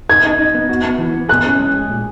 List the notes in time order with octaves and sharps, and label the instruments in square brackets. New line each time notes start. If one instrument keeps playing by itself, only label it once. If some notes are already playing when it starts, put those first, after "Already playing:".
[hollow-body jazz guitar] D#4 [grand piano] G#6
[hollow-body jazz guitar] D#4
D#4
B3
F#4
B3
E3
B3
[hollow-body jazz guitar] G#4 [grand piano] F#6
[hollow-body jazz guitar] C#4
G#3
G#4
A#2